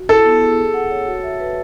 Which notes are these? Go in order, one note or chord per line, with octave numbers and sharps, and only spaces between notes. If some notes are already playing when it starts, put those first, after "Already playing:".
Already playing: F#4
E4 A4
B3
G#4
G#4
F#5
C#5
F#4
E5
B4